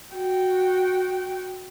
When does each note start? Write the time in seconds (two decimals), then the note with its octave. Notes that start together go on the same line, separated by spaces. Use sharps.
0.15 F#4 G5